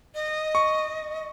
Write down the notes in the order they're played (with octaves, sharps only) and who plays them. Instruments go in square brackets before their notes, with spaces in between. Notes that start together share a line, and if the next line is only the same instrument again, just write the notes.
[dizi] D#5
[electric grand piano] C#6